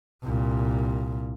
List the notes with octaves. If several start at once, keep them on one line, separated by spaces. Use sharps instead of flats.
C2 A#2